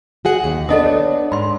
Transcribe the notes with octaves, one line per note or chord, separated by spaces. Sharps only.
F#4 G#4 F#5
D#2
B3 D4 A4 D#5 D#6
C#5
G#2 B5 C6